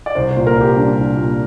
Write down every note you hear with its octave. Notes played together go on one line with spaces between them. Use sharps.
D5
C2 C5
C5
A#2
A#4
C2 G4
G3 D4
C2
A#2